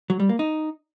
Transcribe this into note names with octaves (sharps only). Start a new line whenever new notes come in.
F#3
G3
A#3
D#4